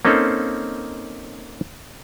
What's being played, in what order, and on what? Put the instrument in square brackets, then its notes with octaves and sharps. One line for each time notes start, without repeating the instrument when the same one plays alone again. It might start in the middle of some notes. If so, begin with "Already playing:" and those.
[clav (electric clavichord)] A#3 C4 C#4 D#4 A4